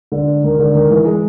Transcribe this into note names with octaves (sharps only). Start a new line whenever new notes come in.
D3
D#3
D3
D#3
E3
G#3